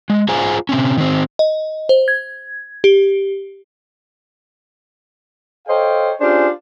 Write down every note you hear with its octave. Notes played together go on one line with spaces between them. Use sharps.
G#3
F4 G#4 C5 F5 G#5 A#5
C3 C4 C#4
D#3 C4
D#5
C5
G#6
G4
A4 C5 C#5 D#5 F5 G5
C#4 D4 F4 G4 G#4 C5